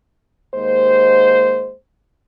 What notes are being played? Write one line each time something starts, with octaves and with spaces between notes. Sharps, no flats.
D#2 G#3 A#3 C5